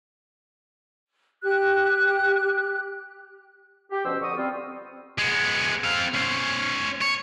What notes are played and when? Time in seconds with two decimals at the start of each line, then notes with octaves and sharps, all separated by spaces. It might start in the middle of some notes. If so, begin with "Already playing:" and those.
1.43 G4 F#6
3.91 G4
4.04 D2 B2 F3 C#4 C5 E6
4.21 F2 D3 C#6 D#6
4.36 G3 C4 F4
5.18 G#3 B3
5.84 C4 F5
6.15 C#4 C5
7.01 C#5